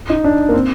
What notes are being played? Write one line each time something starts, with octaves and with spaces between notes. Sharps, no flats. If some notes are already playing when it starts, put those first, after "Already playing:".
D#4
D4
A#3
C4